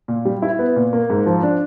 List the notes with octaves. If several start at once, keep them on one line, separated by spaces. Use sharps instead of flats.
A#2
G3
E4
B3
A#2
A#3
G#2
F3
D4